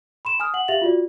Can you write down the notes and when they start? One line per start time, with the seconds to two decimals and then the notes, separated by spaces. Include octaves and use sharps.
0.25 B5 C6 E7
0.40 G#5 D#6 F6
0.54 F#5 F#7
0.68 G4 E5 F5 A6 F7 F#7
0.81 F4 F#4 D5